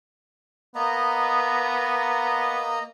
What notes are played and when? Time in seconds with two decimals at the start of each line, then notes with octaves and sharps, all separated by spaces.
0.75 A#3 B3 D#5 A#5